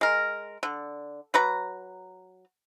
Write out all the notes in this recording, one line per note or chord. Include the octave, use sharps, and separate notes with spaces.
G#3 A#4
D3
F#3 B4 A#5